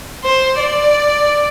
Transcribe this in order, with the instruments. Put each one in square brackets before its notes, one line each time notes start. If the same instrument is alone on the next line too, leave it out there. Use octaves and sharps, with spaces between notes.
[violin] C5
D5